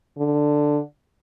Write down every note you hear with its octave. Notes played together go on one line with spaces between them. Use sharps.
D3